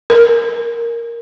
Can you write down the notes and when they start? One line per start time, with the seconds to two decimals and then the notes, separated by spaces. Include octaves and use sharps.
0.10 A#4